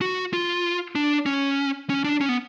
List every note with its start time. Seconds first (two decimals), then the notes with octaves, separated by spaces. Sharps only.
0.01 F#4
0.33 F4
0.95 D4
1.26 C#4
1.90 C#4
2.04 D4
2.21 C#4
2.29 B3